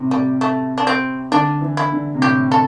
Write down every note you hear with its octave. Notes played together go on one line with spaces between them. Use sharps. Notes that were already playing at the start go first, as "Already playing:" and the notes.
Already playing: A2 C3
C3 G3
A3
D4
C4
D3 D4
E3
E4
D3
C3
A2 G4
A4